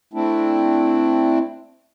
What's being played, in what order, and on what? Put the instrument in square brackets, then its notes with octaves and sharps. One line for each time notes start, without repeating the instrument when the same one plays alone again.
[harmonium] A3 C4 D4 E4